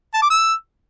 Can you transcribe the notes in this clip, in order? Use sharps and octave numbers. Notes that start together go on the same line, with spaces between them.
A5
D6
E6